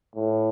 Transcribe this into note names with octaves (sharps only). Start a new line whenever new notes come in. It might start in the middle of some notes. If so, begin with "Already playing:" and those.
A2